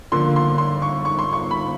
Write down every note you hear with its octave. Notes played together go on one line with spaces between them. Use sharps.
D3 F3 A#3 C6
C6
C6
C#6
C#6
C6
C#6
B5